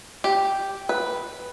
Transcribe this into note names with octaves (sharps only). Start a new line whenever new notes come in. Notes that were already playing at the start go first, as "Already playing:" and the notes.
G4
B4